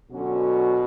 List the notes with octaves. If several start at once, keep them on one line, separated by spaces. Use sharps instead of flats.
B2 D3 F#3 C#4 F#4